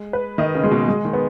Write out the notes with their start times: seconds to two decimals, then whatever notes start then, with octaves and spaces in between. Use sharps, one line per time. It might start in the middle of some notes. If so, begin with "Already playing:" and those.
Already playing: G#3
0.13 B4
0.38 D#3 D#5
0.55 C#3
0.64 G#3
0.71 B2
0.88 G#3
1.05 D#3
1.13 B3